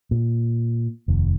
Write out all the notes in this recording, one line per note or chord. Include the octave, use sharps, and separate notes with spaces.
A#2
F1 D#2